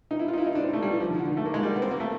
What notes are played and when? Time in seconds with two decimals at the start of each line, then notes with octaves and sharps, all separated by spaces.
0.11 D#4
0.19 E4
0.28 F4
0.33 D#4
0.38 E4
0.47 D#4
0.55 D4
0.64 C4
0.73 A3
0.83 G3
0.91 E3
1.00 F3
1.10 D#3
1.19 D3
1.27 D#3
1.37 A3
1.45 A#3
1.54 G#3
1.63 G3
1.76 B3
1.82 C4
1.91 A#3
2.00 A3